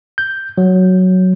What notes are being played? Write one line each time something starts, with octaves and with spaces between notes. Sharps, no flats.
G6
F#3